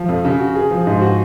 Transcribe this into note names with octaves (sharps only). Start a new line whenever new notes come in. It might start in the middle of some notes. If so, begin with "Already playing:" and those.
Already playing: F3
F2
C#3
F#4
G#4
F3
G#2
F#4